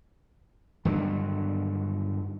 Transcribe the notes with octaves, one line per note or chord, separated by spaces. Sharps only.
G2 D3 D#3 F#3